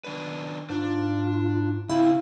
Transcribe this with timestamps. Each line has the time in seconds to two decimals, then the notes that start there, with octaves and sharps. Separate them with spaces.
0.04 D#3 D4 B4
0.70 G#2 D4 F4
1.89 C#3 C4 E4 F5